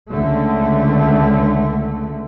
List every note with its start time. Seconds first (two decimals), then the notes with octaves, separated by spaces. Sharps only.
0.11 C#2 D3 A3